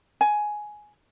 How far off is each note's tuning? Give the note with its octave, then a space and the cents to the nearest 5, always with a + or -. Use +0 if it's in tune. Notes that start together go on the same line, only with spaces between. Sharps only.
G#5 +10